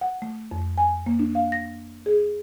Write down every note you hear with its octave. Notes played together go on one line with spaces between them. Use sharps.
F#5
A3
F2
G#5
A#3
D4
F5
A#6
G#4